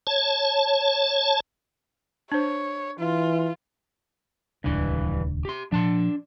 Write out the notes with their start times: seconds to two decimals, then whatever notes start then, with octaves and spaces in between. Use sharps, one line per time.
0.07 C#5 A5
2.32 D4 C5 C#5
3.00 E3 F4
4.64 D#1 C#2 G2 E3 D4
5.45 G4 C6
5.72 A#2 F3 D4 A5 C6